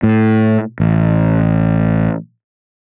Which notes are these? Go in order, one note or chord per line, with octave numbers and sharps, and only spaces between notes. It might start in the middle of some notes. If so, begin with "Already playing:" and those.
A2
A1